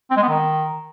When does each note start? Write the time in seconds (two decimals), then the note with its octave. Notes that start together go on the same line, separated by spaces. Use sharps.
0.11 C4
0.17 G#3
0.23 B3
0.29 D#3